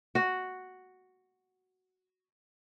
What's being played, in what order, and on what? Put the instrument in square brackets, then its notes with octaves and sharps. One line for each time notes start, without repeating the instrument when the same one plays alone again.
[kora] F#4 F#5